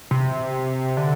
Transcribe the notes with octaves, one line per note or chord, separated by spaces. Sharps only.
C3
D3